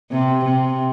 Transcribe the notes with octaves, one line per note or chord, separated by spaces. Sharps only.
C3
C3